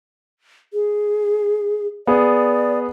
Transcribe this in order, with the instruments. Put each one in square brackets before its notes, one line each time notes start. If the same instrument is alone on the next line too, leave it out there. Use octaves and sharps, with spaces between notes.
[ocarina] G#4
[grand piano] B3 G#4 [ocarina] D5